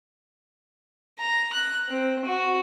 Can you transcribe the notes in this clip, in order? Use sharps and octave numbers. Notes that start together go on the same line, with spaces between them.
A#5
F#6
C4
F#4